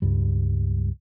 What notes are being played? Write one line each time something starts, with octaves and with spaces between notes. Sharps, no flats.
C#2 G2 G3